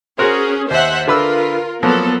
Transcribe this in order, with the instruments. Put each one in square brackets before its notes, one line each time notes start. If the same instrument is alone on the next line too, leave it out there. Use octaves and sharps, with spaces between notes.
[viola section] C#4 G#4 [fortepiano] F#4 A#4 C5
[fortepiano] D#2 [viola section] C5 E5 F#5
[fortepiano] D3 B4 E6 [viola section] F4 A#4
[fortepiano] F3 F#3 A#3 [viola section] B3 A4